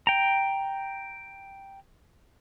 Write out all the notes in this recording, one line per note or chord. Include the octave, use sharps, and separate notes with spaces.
G5 A#5